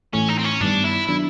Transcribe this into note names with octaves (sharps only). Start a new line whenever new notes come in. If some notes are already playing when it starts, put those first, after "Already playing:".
A2 E3 A3 C#4
D#4
C4
C#4
G2 D#3 G3 B3 D4
E4
D#3 F#3 B3 D4 E4